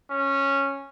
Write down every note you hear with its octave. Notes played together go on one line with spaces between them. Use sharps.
C#4